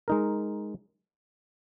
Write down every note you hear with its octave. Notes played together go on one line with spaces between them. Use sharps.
G#3 D#4 A#4